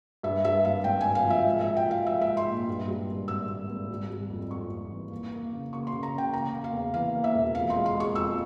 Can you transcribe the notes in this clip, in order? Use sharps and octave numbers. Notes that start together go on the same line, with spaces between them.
G2 E5
G2 E5
G#1 F5
G#1 G5
G#1 G#5
F5
F3 E5
G#2
E5
F3
G5
F3 F5
G#2 E5
E5
G#2
C6
A#1
G2
G3
G#1
G#1 E6
G#1
G#1
G3
G3
F2
F2 C#6
F2
E3
A#3
A#3
C#3
A#3 C#6
C6
C#3
A#5
C#3 G5
A#3 A#5
A#3
F5
E2
E3 F5
A#3
E5
E1
F2 F5
C6
G#3
C6
G#3
C#6
F2 E6